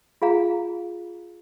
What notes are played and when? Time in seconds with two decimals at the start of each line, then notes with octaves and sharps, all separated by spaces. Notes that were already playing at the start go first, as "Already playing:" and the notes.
0.22 F4 G#4 F5 A#5